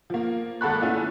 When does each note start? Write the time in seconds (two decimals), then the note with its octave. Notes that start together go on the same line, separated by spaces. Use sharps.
0.10 F3 A#3
0.61 G#1 A#3 A4 F#5 B5 F#6
0.81 A3 B3 C#4 E4 F4